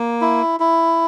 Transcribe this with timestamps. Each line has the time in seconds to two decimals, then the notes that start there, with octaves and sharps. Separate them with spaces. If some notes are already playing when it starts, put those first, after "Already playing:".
Already playing: A#3
0.21 E4
0.60 E4